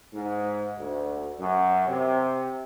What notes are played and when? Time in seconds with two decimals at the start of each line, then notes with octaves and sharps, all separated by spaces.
0.14 G#2
0.78 D2
1.39 F#2
1.87 C3